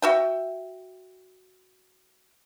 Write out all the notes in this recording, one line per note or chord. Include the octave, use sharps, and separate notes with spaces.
F#4 E5 G5